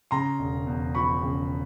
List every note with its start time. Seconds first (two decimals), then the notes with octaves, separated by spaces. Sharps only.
0.11 C#3 A#5 C6
0.39 E1
0.67 E2
0.94 F3 B5 C#6
1.22 C#3